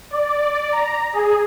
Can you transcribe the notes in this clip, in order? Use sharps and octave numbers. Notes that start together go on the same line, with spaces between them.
D5
A#5
G#4